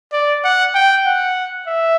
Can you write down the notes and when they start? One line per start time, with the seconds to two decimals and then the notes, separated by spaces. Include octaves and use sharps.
0.13 D5
0.44 F#5
0.75 G5
1.06 F#5
1.67 E5